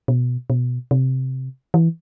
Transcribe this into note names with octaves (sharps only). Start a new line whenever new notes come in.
B2
B2
C3
E3